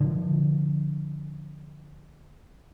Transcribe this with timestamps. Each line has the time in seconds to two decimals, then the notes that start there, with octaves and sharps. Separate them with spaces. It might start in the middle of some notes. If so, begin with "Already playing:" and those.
0.01 D3 F3